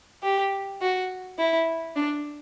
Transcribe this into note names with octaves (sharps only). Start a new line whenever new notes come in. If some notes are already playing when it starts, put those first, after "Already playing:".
G4
F#4
E4
D4